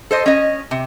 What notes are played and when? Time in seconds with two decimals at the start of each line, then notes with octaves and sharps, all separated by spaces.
0.11 A4 C5 D#5
0.26 C#4 D#5
0.71 C3